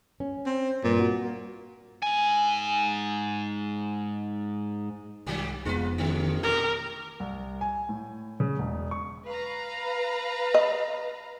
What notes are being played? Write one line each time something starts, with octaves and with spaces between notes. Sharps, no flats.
C#4
C4
G2 A#2
F#4
A#3
G#2 G#5
C2 G#2 D#3 F#3 G3
F1 F2 G#2 B3 F4 G4 B4
A1 D3 G#3
G2 A#2 G4 A#4
C2
G#5
A2
C#3
E1
C#6
B4 F5 A#5
D#5